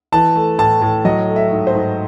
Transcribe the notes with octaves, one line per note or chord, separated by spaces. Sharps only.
E3 A5
A3
A2 A5
A2
F#3 D#5
A3
E5
G#2
C5
G#2